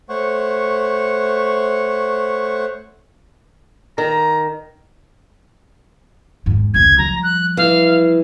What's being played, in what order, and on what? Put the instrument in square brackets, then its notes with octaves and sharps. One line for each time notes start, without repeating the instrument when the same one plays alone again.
[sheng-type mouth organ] A3 C5 C#5 F#5 C#6
[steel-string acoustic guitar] D#3 [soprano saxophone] A#5
[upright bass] E2 G#2
[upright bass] F1 C#2 [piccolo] G#6
[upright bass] F3 G3 [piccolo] A#5
[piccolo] F#6
[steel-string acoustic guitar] E3 [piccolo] F5